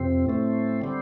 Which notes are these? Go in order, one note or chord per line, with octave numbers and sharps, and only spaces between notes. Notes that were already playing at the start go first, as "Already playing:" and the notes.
Already playing: F2 C3 C4
A2 A3 C4
D3 G3 C4